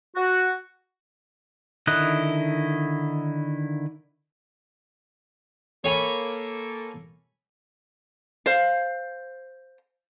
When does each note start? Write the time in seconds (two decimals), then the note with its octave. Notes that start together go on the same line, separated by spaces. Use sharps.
0.16 F#4
1.87 D3 D#3 E4 D#5 F#6
5.84 A#3 A4 C#5 G#5 B5
8.46 C5 F5